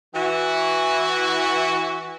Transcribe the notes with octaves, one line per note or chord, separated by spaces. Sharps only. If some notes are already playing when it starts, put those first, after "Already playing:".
E3 F#4